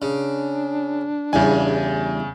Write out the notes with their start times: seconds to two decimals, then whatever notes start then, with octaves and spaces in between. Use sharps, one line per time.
0.02 C#3 D4
1.33 E2 G2 C#3 G#5